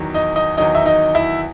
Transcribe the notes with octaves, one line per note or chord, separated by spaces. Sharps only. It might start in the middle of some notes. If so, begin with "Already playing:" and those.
Already playing: E2 D#3 F#3
D#4 D#5
D#4 D#5
E2 D#3 F#3 D#4 D#5
E5
D#4 D#5
E4 E5